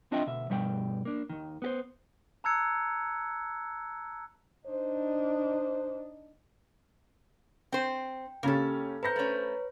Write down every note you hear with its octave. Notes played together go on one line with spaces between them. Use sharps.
C4 D4 F4 D#5 E5 G5
D2 B2 E5
G2 B2 G3 C#5 G5
A#3 D4
D#2 D#3
B3 G4 C5
A5 A#5 E6 F#6 G#6 C#7
D4 D#4 C5
C4 C5 G5
C#3 A#3 C#4 G4 A4
B4 C5 A#5 B5 G6 A#6
A3 C#4 B4 C#5